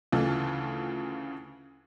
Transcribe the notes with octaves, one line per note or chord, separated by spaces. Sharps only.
D2 C#3 E3 F4 A4